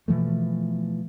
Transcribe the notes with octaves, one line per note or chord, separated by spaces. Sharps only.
B2 E3 F3 A3